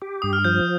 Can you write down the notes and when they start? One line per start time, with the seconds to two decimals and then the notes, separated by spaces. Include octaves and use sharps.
0.02 G4
0.22 G2 D#6
0.33 F6
0.44 F3 G6